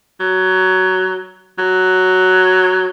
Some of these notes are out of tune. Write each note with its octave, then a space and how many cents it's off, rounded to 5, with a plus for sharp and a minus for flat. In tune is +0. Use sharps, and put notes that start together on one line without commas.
F#3 +15
F#3 +5